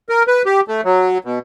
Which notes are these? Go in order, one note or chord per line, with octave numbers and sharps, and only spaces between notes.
A#4
B4
G4
A3
F#3
B2